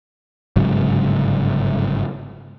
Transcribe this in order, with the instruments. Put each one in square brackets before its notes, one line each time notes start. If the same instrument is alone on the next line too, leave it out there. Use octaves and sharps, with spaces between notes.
[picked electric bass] G1 G#2 C#3 F#3